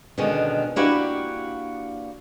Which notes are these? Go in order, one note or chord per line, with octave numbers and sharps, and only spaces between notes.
B2 D3 D#3 G#3 C#4
A#3 D4 E4 F#4 G4 B4